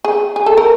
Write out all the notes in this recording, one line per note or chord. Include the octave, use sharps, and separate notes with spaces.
G#4
G#4
A4
A#4